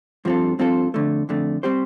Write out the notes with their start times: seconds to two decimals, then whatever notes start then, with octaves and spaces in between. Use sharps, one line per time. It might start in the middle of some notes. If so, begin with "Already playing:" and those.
0.25 G2 F3 C4 F4 A4
0.59 G2 F3 C4 F4 A4
0.94 F2 D3 A3
1.29 F2 D3 A3
1.63 G3 C4 G4 C5